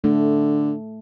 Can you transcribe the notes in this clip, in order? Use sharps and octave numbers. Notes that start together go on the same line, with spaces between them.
D3 A3